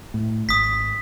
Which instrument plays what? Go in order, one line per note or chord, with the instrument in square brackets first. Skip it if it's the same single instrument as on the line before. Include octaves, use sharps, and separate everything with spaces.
[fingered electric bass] A2
[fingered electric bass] G#1 [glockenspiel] D#6 B6